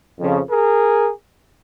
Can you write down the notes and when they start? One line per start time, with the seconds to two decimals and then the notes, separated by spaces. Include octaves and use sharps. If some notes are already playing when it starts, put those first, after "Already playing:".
0.19 F2 C#3 F3
0.47 G#4 A#4